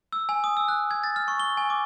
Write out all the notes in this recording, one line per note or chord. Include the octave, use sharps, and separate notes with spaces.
E6
G#5
D#6
E6
F#6
G#6
A6
F6
C#6
G7
G#5
D6